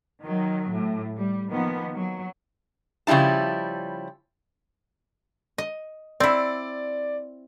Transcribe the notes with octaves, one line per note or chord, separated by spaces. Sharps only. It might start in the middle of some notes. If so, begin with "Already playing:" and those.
D#3 F#3
A2
G3
D#3 F3 A#3 B3
F#3
C#3 F3 G3 E4 A5
D#5
C4 E4 D5